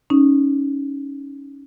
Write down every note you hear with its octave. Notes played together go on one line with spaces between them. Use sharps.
C#4 D#4